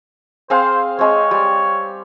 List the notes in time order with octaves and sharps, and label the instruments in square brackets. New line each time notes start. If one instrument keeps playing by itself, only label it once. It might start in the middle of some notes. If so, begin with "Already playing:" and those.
[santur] C4 G#4 F5 [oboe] C5
[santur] G#3 C4 [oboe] C#5
[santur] G3